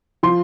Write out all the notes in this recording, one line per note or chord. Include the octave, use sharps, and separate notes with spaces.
F3 C6